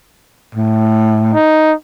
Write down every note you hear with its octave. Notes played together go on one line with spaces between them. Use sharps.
A2
D#4